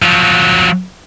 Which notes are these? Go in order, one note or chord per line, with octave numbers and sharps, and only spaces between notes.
F3 F#3